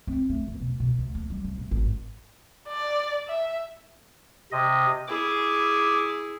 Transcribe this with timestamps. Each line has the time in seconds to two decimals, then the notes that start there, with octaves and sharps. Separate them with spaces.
0.07 C4
0.29 A3
0.47 E2
0.60 B2
0.80 B2
0.98 D2
1.15 A#3
1.30 G3
1.44 C2
1.58 D#1
1.71 G#1
2.68 D5
3.28 E5
4.52 C3 D#5
5.08 E4 G#4 D6